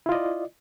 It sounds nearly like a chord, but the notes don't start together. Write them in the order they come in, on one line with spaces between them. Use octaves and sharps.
E4 F4 D#5 D5